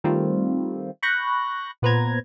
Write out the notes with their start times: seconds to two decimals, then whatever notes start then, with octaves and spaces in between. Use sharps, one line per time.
0.04 D#3 G3 A3 C4 F4
1.03 B5 C#6 F#6 G6 A#6
1.82 A#2 B3 B4 C5 A#5 G#6